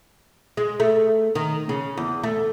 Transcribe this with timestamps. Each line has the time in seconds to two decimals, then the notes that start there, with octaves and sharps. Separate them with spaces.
0.57 G#3
0.80 A3
1.35 D#3
1.69 C#3
1.97 E2
2.23 A3